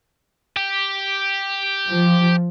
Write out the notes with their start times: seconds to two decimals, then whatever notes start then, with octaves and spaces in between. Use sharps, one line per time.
0.57 G4
1.89 F3